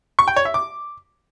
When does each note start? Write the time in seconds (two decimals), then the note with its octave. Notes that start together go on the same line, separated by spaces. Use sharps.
0.19 C#6
0.28 G5
0.36 C#5
0.45 E5
0.54 D6